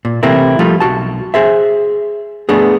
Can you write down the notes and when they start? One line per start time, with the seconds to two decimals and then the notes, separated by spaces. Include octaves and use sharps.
0.05 A#2
0.23 C3 E3 A3 A#3 C4 E4
0.59 F3 G3 A3 F4
0.80 B1 F#4 A5
1.34 G#4 C5 E5
2.49 A3 B3 D4 G#4